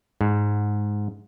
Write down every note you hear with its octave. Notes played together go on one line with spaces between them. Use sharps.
G#2